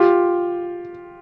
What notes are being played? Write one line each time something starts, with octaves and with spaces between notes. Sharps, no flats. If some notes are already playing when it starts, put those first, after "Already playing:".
Already playing: F4 G4